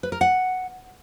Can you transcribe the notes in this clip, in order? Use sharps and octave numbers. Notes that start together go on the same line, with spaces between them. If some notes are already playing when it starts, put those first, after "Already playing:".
B4
A#4
F#5